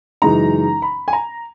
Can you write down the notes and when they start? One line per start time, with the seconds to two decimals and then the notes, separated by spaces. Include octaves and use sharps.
0.22 F#2 C#3 E3 G#3 D#4 A#5
0.82 B5
1.08 G#5
1.13 A#5